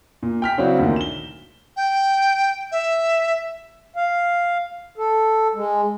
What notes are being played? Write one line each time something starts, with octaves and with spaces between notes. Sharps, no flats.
A#2
G5 F6 B6
C#3 F#3 C4 D4 E4 F#4
D2 A#2 D#3
E7 G7
G5
E5
F5
A4
G#3